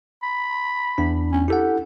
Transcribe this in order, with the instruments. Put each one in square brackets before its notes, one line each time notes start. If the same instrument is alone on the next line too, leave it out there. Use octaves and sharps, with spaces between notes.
[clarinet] B5
[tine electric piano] E2 D4
[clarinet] C#4
[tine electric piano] E4 A4 F#5 [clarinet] G4